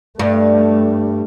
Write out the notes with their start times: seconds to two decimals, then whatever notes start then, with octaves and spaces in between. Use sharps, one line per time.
0.19 G2 A3